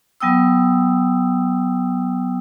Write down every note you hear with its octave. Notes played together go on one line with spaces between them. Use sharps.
F#3 B3 G5 D#6 E6